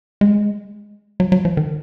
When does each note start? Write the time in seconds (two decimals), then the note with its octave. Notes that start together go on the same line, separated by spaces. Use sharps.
0.21 G#3
1.20 F#3
1.32 F#3
1.45 F3
1.57 D#3